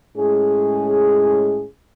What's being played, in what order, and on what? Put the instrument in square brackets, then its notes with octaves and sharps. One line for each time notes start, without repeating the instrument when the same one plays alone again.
[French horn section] A2 G#3 C#4 G#4